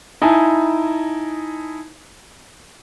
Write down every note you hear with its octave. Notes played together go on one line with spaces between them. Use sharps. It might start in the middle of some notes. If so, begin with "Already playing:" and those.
D#4 E4 G#5 A5